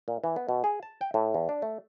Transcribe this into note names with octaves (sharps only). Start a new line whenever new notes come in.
A#2
E3
B3
B2
G#4
A5
G5
A2
E2
D4
A3